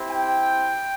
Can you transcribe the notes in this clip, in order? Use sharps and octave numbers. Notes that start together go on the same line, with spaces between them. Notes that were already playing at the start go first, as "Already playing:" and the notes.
Already playing: C4 E4 G4
G5